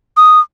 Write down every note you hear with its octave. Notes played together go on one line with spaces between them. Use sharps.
D#6